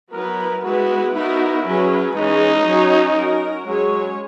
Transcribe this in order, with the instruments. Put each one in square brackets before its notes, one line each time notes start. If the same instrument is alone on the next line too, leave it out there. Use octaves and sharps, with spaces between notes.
[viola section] F#3 B3 E4 B4 [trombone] A#4
[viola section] G#3 B3 E4 B4 [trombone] F#4
[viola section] B3 D#4 F#4 A#4 [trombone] E4
[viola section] F#3 C#4 G#4 B4
[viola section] E3 G#3 C#4 G#4 [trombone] D#4
[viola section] F#3 C#4 F#4 C#5
C#4 F#4 A#4
[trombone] F#3 [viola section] G#3 C#4 G#4 C#5